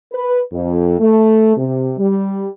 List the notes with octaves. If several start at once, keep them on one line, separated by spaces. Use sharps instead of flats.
B4
F2
A3
C3
G3